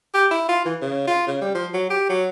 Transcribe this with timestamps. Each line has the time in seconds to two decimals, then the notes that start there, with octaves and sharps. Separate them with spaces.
0.14 G4
0.31 E4
0.49 F4
0.65 E3
0.82 C#3
1.08 F4
1.27 C#3
1.42 G3
1.55 F3
1.74 F#3
1.90 G4
2.09 F#3